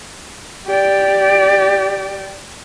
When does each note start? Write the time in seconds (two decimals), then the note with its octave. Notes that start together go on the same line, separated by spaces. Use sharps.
0.68 G4 D5